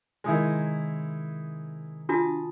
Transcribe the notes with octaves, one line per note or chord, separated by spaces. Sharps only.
C3 D#3 G#3 D#4 E4
D4 F4 F#4 A5 D#6